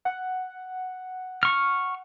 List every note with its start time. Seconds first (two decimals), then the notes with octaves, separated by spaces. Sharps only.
0.05 F#5
1.43 C#6 F6